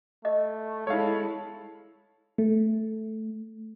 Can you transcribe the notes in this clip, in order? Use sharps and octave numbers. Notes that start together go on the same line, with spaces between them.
A3 D#5
G#3 E4 A4 C#5 F5
A3